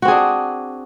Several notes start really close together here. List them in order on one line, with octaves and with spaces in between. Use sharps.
F#4 C4 G#4 D4